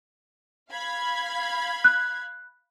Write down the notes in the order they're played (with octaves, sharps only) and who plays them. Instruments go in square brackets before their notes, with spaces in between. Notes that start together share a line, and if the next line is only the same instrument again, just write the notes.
[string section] F5 B5 G#6
[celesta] F#6